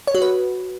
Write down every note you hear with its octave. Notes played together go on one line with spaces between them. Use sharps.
C#5
F#4
B4